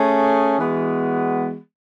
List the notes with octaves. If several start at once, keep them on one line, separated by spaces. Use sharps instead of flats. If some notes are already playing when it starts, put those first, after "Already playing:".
Already playing: A3 C#4 G#4
E3 G#3 B3 F#4